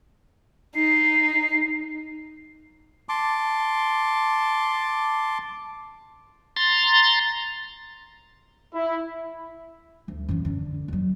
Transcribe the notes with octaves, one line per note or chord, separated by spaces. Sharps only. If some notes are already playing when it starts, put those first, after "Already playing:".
D#4 C7
A5 C6 D6
A#5 C6 A6
E4
D2
F#2 E3
D3
F2 F#3